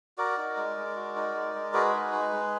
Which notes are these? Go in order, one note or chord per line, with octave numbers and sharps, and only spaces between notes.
F#4 A#4 D5
D#4
G#3
G#3
F#4
D#4
G#3
G#3
F#4 G#4 B4
D#4
G#3
G#3